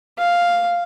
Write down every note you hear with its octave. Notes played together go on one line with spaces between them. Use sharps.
F5